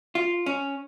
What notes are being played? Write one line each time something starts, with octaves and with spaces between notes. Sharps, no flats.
F4
C#4